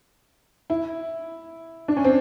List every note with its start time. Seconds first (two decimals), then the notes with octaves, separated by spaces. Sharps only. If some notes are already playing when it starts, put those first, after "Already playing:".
0.70 E4
1.88 D4
1.97 C#4
2.04 C4